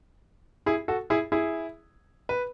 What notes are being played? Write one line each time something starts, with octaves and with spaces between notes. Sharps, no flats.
E4 G#4
F#4 A4
E4 G#4
E4 G#4
B4